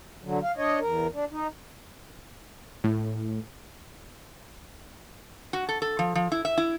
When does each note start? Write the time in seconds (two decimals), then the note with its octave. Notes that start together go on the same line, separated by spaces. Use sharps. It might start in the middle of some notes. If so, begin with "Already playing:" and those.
0.23 D3 F#3
0.43 F5
0.57 D4 C#5 D#5
0.80 E2 A#4
1.13 D4
1.31 D#4
2.84 A2
5.53 F#4
5.69 A4
5.82 A4
5.99 F3
6.15 F3
6.32 E4
6.45 E5
6.58 E4